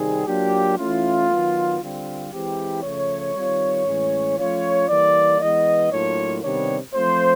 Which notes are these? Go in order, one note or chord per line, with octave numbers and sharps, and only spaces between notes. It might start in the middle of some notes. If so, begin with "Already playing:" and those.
Already playing: C3 D#3 G3 C4 D#4 G#4
F#3 A#3 D4 F4 G4
E3 A3 C#4 E4 F4
D#3 F#3 B3
D3 G3 C4 F4
E3 G#3 C4 E4 G4
C#3 F3 A3 C#5
D#3 G3 C4 F4
A2 E3 G#3 C#4
F3 A3 C#4 F4 C#5
E3 G3 A#3 D5
E3 G#3 B3 D#5
A2 F#3 A#3 D4 F4 C#5
C3 D#3 G3 B3 D4 C#5
F3 A3 C4 F4 C5